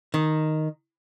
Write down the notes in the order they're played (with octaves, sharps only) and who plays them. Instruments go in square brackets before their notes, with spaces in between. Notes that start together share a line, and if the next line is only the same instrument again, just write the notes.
[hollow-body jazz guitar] D#3